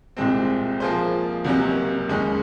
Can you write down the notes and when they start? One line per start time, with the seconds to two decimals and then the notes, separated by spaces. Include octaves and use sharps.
0.17 C2 A#2 G#3 C4
0.80 F3 A#3 F4 G#4 C5
1.44 C#2 C3 F#3 A#3 C#4
2.09 D#2 C#3 G#3 C#4 G#4